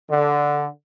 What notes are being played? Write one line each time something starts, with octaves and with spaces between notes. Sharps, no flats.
D3